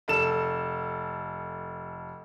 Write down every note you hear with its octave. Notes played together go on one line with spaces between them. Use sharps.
F1 A4 E7